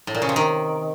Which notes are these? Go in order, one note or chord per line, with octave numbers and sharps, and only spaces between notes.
A2
A#2
C#3
C3
D#3